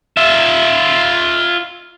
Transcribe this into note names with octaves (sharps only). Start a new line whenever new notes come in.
F4 E5